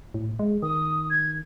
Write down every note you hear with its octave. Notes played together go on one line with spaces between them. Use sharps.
A2
G#3
D#3 D#6
G#6